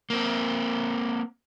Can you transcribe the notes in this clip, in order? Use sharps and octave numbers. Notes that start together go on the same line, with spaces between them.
A#3 C4